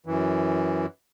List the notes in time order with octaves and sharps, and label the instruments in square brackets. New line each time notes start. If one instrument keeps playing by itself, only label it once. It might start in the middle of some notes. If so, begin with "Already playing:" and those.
[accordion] F#2 E3